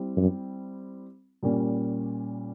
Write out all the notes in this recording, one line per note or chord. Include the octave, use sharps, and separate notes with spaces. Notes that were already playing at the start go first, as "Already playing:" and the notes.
Already playing: G3 C4 E4
F#2
A#2 G3 A#3 C#4